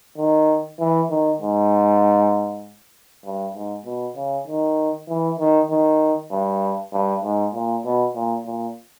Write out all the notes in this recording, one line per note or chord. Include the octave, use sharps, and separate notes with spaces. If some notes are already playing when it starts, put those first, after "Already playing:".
D#3
E3
D#3
G#2
G2
G#2
B2
C#3
D#3
E3
D#3
D#3
G2
G2
G#2
A#2
B2
A#2
A#2